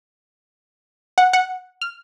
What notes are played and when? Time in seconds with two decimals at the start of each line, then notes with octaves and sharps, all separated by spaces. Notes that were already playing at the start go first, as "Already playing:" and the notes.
1.18 F#5
1.33 F#5
1.81 F6